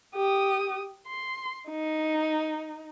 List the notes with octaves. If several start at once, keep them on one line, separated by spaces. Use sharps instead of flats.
G4 D#6
C6
D#4